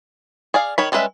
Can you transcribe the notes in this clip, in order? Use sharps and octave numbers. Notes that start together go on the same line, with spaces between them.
G#4 D5 F5
D#3 C#5 B5
G3 G#3 C#4 B4 E5